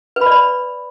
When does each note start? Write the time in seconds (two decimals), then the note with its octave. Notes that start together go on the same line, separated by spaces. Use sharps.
0.16 B4
0.21 B5
0.26 D5
0.32 B5